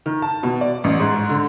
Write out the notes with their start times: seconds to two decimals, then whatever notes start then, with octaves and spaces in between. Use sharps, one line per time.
0.06 D#3
0.22 A5
0.43 B2
0.61 D5
0.84 A1
1.00 G#2
1.29 D3